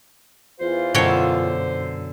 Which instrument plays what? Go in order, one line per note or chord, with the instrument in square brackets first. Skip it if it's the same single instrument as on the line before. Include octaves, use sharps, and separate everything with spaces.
[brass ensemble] E2 E3 F4 [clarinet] C5
[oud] F#2 D3 [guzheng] B2 C#5 G5 [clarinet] C5